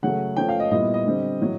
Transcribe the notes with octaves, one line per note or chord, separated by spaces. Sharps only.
C#3 F#3 A3 F#5
F3 A3 C#4 G5
F5
D#5
A#2 G3 B3 E4 D#5
D#5
D3 G3 C4
A2 F#3